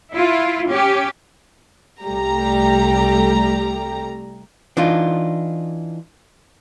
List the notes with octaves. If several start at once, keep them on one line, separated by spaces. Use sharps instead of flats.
E4 F4
C#4 G4
C2 G3 A3 G4 A#5
E3 D4 D#4 F4